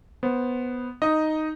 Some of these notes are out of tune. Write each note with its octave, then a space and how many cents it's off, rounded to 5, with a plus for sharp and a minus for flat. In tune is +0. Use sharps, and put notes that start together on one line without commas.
B3 +0 C5 +5
D#4 +0 D#5 +0